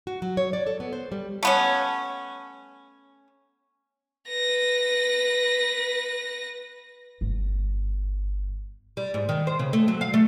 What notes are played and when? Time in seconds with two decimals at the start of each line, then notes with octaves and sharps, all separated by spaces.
0.07 F#4
0.22 F#3
0.37 C#5
0.53 D5
0.67 A4
0.80 B3
0.93 C5
1.12 G3
1.43 A3 B3 C#4
4.29 B4 A#6
7.21 G1
8.97 G3
9.14 G#2
9.29 D#3
9.47 C5
9.59 C#3
9.73 A3
9.88 F#3
10.01 F5
10.14 A3